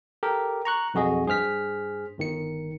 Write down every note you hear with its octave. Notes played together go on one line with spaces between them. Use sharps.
G4 A4 A#4
A#5 C#6 F#6
B1 F2 F#4 G#4 D#5
G2 G#4 C5 F6 B6
G1 D#3 C#7